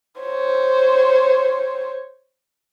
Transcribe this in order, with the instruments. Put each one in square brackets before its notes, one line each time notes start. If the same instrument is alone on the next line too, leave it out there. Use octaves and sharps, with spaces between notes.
[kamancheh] C5 C#5